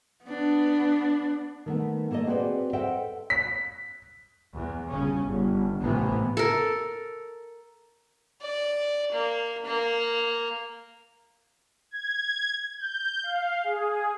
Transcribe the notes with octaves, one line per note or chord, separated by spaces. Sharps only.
B3 D4
D#3 A3 B3
A3 A#3 A4 C#5 D#5
C4 F#4 G#4 A4 B4 D5
A4 C5 D#5 E5 F#5 G5
B6
E2
G1 C#3 C#4
G1
A1 A2 C3 E3 A#3 B3
A4 A#4
D5
A#3
A#3
G#6
G6
F5
G#4